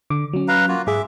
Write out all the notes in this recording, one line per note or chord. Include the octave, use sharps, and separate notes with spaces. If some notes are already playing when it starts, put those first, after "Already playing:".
D3 D6
F#3 C#4
B4 F5 A#5
A#3 F4 F#4
G#2 G#4 E5 D6